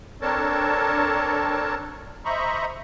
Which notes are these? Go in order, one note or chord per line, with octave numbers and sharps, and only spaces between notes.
C4 D4 A4 A#4 C#5 A5
C5 D#5 E5 A#5 B5 C#6